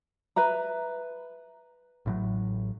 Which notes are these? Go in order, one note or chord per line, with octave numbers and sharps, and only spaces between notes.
B4 E5 A#5
A1 A2 F#3